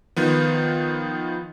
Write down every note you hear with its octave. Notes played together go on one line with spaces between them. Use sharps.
D#3 F3 B3